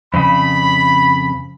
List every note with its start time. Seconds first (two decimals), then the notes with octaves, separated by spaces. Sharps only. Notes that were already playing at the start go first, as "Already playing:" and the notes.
0.14 F2 C#3 B5